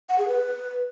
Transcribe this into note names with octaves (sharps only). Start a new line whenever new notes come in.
F#5
G#4
B4